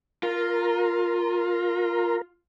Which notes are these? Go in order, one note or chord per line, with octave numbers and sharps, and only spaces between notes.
F4 A#4